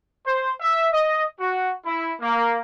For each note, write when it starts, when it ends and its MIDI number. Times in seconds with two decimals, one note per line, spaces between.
0.26 0.49 72
0.60 0.87 76
0.91 1.22 75
1.39 1.72 66
1.85 2.12 64
2.20 2.58 58